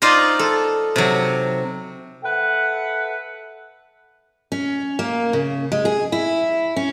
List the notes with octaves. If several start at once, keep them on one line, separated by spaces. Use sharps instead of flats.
D#4 F4 C5 D5 D#5
A4
C3 F#3
A4 B4 E5 F#5
C#4
A#3
C#3
G#3
G#4
E4
C#4